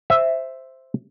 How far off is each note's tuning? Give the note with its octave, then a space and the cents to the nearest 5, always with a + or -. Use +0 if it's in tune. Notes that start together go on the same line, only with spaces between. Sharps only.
C5 +0 E5 +0